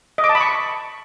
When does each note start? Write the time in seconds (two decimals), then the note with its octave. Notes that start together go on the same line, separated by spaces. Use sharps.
0.18 D#5
0.24 D6
0.29 A5
0.35 B5
0.41 C#6